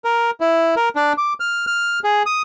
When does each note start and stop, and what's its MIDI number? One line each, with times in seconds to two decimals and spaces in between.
0.05 0.31 70
0.40 0.75 64
0.76 0.89 70
0.96 1.13 62
1.18 1.33 86
1.40 1.66 89
1.67 1.99 89
2.04 2.23 68
2.26 2.42 87